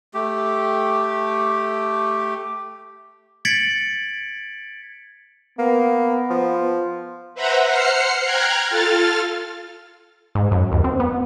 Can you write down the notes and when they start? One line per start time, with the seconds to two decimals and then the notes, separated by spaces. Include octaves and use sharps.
0.14 A3 G4
3.45 G#6 A6 B6 C#7 D7 F#7
5.59 A#3 B3
6.29 F3
7.35 B4 C5 E5 F#5 A#5 B5
7.67 C5 F#5 F6 C7 C#7
8.24 G5 A#5 F6 F#6 G#6
8.70 F4 A4 F6 A6
10.35 G#2
10.51 F#2
10.72 D#2
10.84 C4
11.00 B3